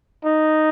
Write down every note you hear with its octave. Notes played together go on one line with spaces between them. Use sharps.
D#4